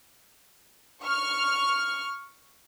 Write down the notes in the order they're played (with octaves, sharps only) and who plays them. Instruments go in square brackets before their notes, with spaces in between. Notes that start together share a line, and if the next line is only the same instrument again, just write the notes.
[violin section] C#6 F6